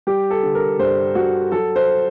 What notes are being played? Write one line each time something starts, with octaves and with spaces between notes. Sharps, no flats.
G3 G4
A4
D3
A#4
G2 C5
G2 F#4
F#3 A4
C5